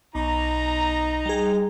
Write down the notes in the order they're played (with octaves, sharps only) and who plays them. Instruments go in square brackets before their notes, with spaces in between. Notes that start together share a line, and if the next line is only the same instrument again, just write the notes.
[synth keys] B1 [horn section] D#4 A#5
[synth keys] G3 G#4